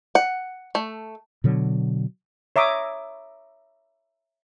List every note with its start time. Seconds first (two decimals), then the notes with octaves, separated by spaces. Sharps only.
0.15 F#5
0.75 A3
1.44 B2 D3 F#3
2.56 C#5 E5 A#5 D6 D#6